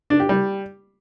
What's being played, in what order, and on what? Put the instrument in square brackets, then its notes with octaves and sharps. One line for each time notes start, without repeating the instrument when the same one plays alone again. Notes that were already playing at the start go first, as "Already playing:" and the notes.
[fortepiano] D4
G4
G3